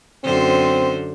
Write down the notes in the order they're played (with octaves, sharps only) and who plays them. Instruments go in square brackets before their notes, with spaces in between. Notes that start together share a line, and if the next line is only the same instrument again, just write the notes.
[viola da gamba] F#2 D3 C5 [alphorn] C4